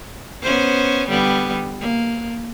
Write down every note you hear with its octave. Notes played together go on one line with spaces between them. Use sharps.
B3 C#4 C5
D3 G3 B3
A#3